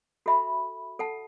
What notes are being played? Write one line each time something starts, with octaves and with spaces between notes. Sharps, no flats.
F#4 A4 E5 B5
A4 F#5 A5